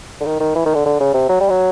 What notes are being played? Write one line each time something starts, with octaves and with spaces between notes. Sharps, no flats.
D3
D#3
D#3
E3
D#3
D3
D3
C#3
C3
F#3
G3
F#3